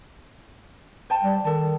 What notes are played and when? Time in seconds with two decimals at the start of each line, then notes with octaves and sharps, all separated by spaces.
1.10 C5 G5 A5
1.23 G3
1.45 D#3 A4 A5